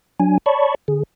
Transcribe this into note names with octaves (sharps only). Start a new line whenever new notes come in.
F#3 D4 G#5
C#5 D5 A5 B5 C#6
D3 G#4